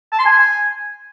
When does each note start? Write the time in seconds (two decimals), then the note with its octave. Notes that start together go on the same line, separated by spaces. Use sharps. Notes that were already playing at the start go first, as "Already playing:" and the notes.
0.12 A5
0.19 C6
0.26 G#5